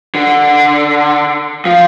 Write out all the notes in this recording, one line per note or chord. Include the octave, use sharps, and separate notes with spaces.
D3
F3